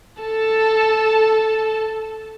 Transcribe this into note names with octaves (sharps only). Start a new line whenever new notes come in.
A4 A5